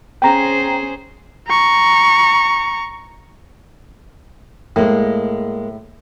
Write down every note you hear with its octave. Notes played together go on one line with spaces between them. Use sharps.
C#4 G#4 C5 G5 A#5
A#5 C#6
A2 G#3 A#3